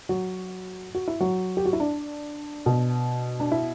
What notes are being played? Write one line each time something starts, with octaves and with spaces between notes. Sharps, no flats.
F#3 F#4
F#4
E4
F#3 F#4
G4
F#4
E4
D4
B2
D4
E4